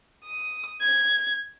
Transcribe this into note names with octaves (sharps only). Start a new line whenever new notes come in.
D#6
G#6